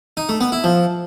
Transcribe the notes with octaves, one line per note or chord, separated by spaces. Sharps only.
D#4
A3
B3
E4
F3